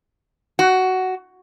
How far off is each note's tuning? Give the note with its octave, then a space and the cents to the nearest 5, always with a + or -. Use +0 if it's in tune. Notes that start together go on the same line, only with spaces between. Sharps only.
F#4 +10